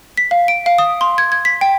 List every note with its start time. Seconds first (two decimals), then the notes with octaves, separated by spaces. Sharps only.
0.17 B6
0.31 F5
0.48 D7
0.66 F5
0.78 D#6
1.01 C6
1.18 G#6
1.32 G#6
1.45 B6
1.61 G5